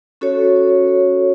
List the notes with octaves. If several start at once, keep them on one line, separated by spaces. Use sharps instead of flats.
C#4 F#4 A4 C#5